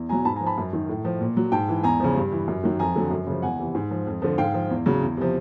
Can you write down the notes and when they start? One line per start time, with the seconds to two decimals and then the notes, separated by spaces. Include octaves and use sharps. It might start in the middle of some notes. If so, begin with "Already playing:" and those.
Already playing: E2
0.09 B2 F#3 G#5 A#5
0.25 G#2 A5 B5
0.36 G#5 A#5
0.41 F3
0.46 A5 B5
0.58 F#2
0.73 D#3 F#3
0.89 A2
1.05 F3
1.21 A#2
1.37 F#3
1.52 G#2 G5 A5
1.69 E3
1.84 E2 G#5 A#5
2.00 C#3 F3
2.16 G2
2.32 E3
2.48 F#2
2.64 D#3 F#3
2.79 F2 G#5 A#5
2.96 D3 F#3
3.11 F#2
3.27 C#3 F3
3.42 E2 F#5 G#5
3.59 C3 E3
3.75 G#2
3.91 F3
4.07 F2
4.22 D3 F3
4.38 G#2 F5 G5
4.54 F3
4.70 E2
4.86 C#3 F#3
5.02 E2
5.17 C3 F3